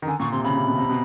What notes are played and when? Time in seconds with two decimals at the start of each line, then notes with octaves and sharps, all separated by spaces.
0.02 D#3
0.07 D3 G#5
0.20 A#2 C#6
0.32 C3 C6
0.44 C#3 B5
0.56 C3
0.68 B2
0.78 C3
0.89 B2